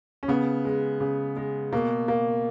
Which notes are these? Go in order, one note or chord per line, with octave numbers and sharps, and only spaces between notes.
C#4
C#3 B3
G#3
C#3
G#3
B2 A#3
A#3